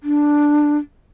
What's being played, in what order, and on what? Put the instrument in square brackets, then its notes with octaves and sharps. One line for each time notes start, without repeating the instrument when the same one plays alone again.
[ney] D4